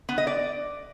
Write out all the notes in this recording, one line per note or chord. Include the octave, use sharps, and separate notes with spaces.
B3
D#5
D5